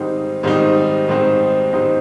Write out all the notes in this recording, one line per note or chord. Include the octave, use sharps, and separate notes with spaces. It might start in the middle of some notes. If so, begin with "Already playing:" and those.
Already playing: G#2 D#3 G3 C4 D#4
G#2 D#3 G3 C4 D#4
G#2 D#3 G3 C4 D#4
G#2 D#3 G3 C4 D#4